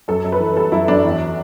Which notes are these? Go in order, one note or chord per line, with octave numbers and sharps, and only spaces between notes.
F#2 A4
F#2
B4
E3
G3 A4
F#2 E4
F#2 D4
E2